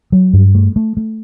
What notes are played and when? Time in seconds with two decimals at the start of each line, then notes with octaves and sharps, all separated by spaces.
0.12 F#3
0.33 G2
0.55 A3
0.76 A3
0.97 A3